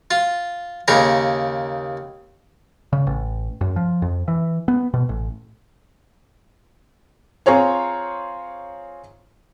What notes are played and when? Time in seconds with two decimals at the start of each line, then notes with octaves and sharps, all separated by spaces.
0.11 F4
0.88 D#2 C#3 G#4 A#5
2.93 C#3
3.07 A1
3.61 F#2
3.76 F3
4.02 F2
4.28 E3
4.68 B3
4.94 B2
5.09 A1
7.46 C4 F4 G#4 C#5 A#5